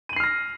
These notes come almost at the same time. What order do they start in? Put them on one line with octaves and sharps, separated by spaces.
D#7 F#7 C7 F6 A#6